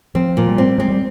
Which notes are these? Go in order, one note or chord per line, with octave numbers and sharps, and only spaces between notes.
F3 C4
A#2 F3
G3
C4
G#3 C4
G3